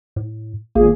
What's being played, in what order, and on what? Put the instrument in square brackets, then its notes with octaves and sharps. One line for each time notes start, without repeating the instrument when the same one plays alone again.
[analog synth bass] A2
[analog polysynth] G#1 A#2 G#4 [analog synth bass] A#3